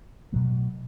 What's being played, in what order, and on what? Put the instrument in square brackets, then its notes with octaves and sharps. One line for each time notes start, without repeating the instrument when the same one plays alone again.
[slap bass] B2 F#3 A3